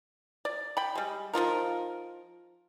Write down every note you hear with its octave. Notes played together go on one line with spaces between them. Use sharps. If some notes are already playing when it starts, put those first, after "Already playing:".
D5
G5 B5
G3 G#3
F3 D#4 F4 A#4